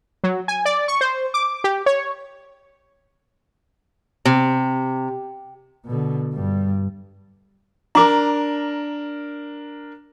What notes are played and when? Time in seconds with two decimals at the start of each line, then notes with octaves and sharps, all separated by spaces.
0.24 F#3
0.48 G#5
0.65 D5
0.88 C#6
1.01 C5
1.34 D6
1.64 G4
1.86 C#5
4.25 C3
5.86 B2 D3
6.34 G2 G3
7.95 D4 A#4 A#5 D6